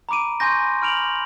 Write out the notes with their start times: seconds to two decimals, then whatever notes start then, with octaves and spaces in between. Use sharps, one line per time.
0.09 A#5 B5 D6 D7 D#7
0.40 G#5 C6 C#6 G6 A#6
0.82 B5 F6 D7 F7 F#7